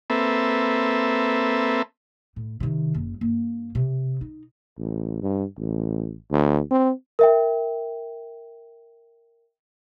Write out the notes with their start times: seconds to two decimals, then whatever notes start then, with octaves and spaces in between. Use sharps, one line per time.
0.10 A#3 C4 A4 B4 E5
2.36 A2
2.60 C3 D#3
2.95 F#1
3.21 G2 A#3
3.75 C3
4.21 D#4
4.78 A1
5.23 G2
5.59 A1
6.31 D2
6.71 C4
7.19 A#4 E5 G5